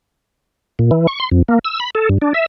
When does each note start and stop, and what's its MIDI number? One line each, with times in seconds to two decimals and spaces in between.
0.79 0.91 46
0.91 1.07 52
1.07 1.19 85
1.20 1.29 84
1.31 1.42 41
1.48 1.59 58
1.65 1.80 88
1.80 1.90 83
1.95 2.09 69
2.09 2.18 43
2.22 2.33 62
2.34 2.46 76